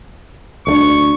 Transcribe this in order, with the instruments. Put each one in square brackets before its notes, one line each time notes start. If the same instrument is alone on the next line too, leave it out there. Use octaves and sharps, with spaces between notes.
[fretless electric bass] D2 G#3 D4 [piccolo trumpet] C#6